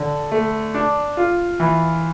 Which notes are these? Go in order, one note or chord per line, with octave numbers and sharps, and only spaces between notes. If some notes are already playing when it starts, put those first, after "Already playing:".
Already playing: D3
A3
D4
F4
E3